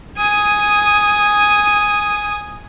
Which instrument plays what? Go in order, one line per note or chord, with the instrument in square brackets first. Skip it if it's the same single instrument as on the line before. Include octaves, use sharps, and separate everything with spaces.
[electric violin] G#5 D#6